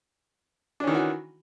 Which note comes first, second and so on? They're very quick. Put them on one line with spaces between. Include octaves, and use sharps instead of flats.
D4 C#4 D#3 E3 F#4